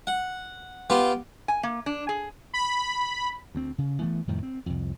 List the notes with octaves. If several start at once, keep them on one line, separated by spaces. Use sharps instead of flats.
F#5
B3 F4 G4
G#5
A#3
D4
G#4
B5
D2 C4
C#3
E3 A3 B3
F2 A2 D#3 G3
C4
C2 F2